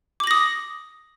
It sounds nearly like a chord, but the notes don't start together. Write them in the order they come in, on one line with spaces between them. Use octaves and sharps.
D6 F#7 A#6 D#6